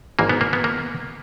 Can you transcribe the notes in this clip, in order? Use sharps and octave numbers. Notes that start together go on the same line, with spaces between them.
G#1 G#2 E3 A#3
B3
A#3
B3
A#3